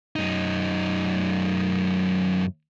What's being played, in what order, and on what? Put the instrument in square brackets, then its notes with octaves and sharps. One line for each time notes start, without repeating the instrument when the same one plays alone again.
[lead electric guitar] F#2 D#4